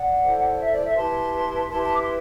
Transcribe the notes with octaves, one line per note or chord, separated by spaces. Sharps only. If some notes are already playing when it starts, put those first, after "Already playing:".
Already playing: D5 F#5
E4 A4 C5
D5
E5
D5
E5
E4 G4 B4 A5 C6
E4 G4 B4 A5 C6
A5 C6
D6
C6